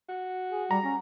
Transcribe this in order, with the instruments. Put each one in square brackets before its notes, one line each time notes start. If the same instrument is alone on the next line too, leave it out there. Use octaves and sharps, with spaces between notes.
[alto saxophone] F#4
[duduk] G#4
[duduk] G3 [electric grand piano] A#5
[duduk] C#4